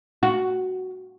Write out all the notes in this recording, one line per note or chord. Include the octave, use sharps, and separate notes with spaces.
F#4